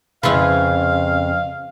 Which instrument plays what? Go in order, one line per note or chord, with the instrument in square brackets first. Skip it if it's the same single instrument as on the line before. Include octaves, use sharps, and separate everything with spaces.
[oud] F2 C#3 [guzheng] E4 F4 B4 [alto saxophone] F5